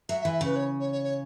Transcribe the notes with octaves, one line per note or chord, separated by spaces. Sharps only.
F#3 E5
E5
E3
E5
C#3 B4
C#5
C#5
C#5
C#5